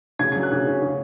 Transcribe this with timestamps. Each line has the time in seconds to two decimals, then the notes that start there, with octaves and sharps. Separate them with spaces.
0.19 C#3 G#6
0.32 F#3 G#6
0.43 F#6
0.52 C#3
0.67 C#4
0.82 C#3